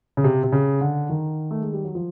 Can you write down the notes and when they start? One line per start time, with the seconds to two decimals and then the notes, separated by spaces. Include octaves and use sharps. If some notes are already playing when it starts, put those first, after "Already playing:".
0.17 C#3
0.24 C3
0.44 C3
0.52 C#3
0.81 D3
1.09 D#3
1.51 A3
1.62 G#3
1.73 G3
1.84 F#3
1.95 F3